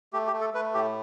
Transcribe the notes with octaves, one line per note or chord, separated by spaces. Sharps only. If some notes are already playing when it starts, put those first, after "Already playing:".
A3 G4
G4
A3
A4
A3 B4
A2 G4